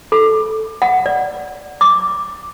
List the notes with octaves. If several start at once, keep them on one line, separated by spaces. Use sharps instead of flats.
A4
F#5
D5
D6